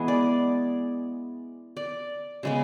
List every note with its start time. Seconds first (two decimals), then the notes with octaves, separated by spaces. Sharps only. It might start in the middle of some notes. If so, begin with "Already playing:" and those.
Already playing: E3 G#3 B3 G#4
0.08 D5
1.77 D5
2.43 C#3 G#3 B3